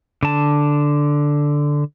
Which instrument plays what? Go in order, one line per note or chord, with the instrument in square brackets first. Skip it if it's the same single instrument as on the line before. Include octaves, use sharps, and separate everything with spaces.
[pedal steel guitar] D3 A5